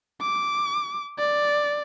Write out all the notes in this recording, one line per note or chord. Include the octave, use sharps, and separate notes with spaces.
D6
D5